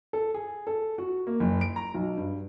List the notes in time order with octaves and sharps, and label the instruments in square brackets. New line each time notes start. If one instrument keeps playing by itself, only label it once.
[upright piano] A4
G#4
A4
F#4
A#3
F#1
D7
A#5
B1
G2